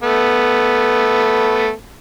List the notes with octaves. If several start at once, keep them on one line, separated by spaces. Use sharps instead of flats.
A3 B3